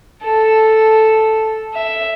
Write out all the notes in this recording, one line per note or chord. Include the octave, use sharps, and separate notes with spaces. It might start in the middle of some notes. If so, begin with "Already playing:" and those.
A4
E5